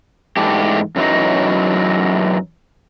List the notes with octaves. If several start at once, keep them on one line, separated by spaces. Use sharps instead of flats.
G#2 E3 A3 D4 G4
F#2 E3 F#3 D#4